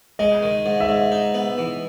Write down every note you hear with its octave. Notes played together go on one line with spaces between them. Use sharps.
G#3 D#5
D#3
G#2
E5
G#2
D#4
B3
E3